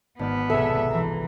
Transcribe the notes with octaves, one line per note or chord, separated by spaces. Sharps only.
G#1 B3 D5 F6
C2 B2 G#4 A4 E5
E3 A#5